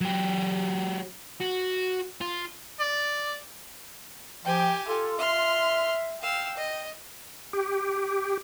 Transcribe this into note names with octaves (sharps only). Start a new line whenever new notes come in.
F#3 G4
F#4
F4
D5
F3 G4 G5 G#5
F4 A4
E5 C6 F6
F5 G5 E6
D#5
G4